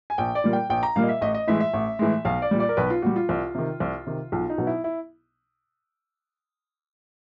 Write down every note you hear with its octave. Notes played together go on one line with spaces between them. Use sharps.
G#5
A#1 G5
D5
A#2 G3 A#3
G5
A#1 G5
A#5
A#2 G3 A#3 F5
D#5
E5
A1 D#5
D#5
A2 E3 G#3 E5
E5
A1
A2 E3 G#3
B1 F5
D5
A#2 G3
D5
A#4
B1 B4
F4
A#2 G3 F#4
F4
C2
C3 D#3
C2
C3 D#3
B1 F4
D#4
B2 F#3 B3
E4
E4